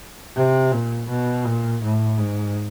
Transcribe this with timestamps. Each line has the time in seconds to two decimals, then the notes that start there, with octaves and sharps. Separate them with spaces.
0.36 C3
0.72 A#2
1.09 B2
1.44 A#2
1.82 A2
2.17 G#2